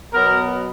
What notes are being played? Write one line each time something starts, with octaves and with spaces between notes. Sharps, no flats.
B2 F#3 B3 A#4